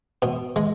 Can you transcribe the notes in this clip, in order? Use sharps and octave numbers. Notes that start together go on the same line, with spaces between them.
B2
G#3